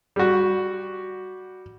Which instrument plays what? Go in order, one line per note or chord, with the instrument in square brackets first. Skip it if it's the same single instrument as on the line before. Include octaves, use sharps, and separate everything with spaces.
[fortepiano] G3 F#4